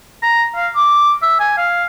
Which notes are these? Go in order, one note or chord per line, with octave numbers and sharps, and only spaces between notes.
A#5
F5
D6
E5
G#5
F5